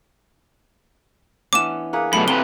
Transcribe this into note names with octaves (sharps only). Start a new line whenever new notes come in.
E3 B3 C#4 D4 D6 E7
A#3 G#4 B4 C#5 F#5
F#2 B2 A3 B5
C3 B4 G7